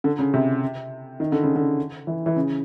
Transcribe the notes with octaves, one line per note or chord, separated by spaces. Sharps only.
D3
C#3
C3
D#3
D3
C#3
D3
E3
E3
C#3